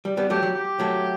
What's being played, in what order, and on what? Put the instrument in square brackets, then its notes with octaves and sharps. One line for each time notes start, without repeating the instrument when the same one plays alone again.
[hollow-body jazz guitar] G3
G3 B3
[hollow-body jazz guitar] F#3 A3 [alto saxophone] G4
[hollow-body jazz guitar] F#3
[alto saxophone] G4
[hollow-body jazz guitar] F#3 A3